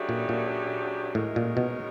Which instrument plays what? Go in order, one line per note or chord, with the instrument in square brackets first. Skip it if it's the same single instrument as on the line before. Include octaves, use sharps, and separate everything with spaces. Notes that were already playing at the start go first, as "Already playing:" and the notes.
Already playing: [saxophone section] C#3 F#3 A3 D4 G4
[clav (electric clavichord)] A#2
A#2
[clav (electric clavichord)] A2 [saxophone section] D#3 G#3 C#4 F#4 A#4
[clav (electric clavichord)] A#2
B2